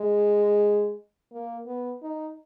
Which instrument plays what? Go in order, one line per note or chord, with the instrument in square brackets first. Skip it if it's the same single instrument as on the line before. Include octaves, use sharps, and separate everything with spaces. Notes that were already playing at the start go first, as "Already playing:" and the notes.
Already playing: [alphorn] G#3
A#3
B3
D#4